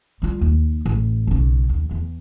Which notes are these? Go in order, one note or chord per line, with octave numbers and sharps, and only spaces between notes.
G3 F4
D#2
A1
B1 C#3
D#2
E2